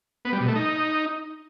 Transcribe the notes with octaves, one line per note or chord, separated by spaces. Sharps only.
B3
G3
B2
A3
D#4